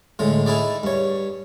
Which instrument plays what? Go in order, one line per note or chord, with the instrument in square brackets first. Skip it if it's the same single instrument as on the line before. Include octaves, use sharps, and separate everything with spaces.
[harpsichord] A2 D3 G#3
D#4 E4 G#4 D5
G2 C#5